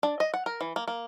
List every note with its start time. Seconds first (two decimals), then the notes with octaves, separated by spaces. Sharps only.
0.03 D4
0.20 D#5
0.34 F#5
0.46 A#4
0.61 E3
0.76 A#3
0.88 A#3